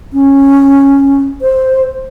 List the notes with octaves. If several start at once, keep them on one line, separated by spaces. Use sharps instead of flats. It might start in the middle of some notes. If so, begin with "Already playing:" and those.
C#4
C5